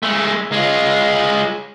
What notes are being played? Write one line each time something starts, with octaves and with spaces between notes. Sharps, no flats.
G#3 A3
G#3 F4